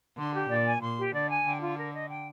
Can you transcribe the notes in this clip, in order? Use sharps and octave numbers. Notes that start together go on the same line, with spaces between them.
D3 C6
G4
A#2 D5
G#5
A#2 C6
G4
D3 D5
G#5
D3 G5
F4
A#4
D#5
G5